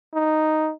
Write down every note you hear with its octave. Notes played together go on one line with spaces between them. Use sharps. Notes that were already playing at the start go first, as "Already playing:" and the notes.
D#4